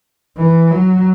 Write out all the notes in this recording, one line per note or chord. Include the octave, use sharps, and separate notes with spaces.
E3
F#3